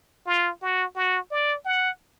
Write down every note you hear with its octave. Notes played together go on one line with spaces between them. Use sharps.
F4
F#4
F#4
D5
F#5